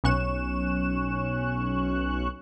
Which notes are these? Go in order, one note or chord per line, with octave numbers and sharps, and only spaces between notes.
B1 C#4 C#6 F#6 E7